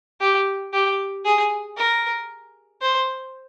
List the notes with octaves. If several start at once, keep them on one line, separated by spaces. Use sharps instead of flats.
G4
G4
G#4
A#4
C5